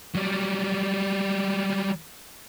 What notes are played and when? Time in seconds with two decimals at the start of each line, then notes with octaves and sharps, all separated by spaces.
0.15 F#3 G3